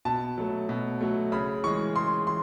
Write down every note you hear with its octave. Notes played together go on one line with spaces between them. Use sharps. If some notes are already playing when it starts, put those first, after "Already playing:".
B2 A5
F#3 A3
B2
F#3 A3
C#3 B5
E3 G#3 C#6
C#3 C6
E3 C6